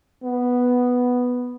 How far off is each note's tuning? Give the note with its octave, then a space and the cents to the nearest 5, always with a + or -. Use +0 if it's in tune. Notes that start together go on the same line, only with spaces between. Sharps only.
B3 +0